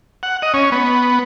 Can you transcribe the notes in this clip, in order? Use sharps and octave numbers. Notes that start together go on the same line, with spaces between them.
F#5
D#5
C#4
B3